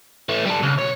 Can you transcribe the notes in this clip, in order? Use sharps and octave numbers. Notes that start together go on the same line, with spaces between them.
E3 A3
G3 A4
C#2
B1 C#5